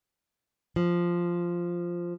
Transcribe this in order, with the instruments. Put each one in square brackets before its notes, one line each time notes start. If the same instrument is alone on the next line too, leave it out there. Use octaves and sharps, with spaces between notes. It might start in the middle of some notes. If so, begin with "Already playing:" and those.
[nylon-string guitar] F3